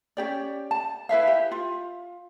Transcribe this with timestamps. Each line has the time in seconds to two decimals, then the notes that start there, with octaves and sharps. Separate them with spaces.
0.17 C#4 G4 D5
0.71 A5
1.09 E4 B4 E5 F5
1.27 G4
1.51 F4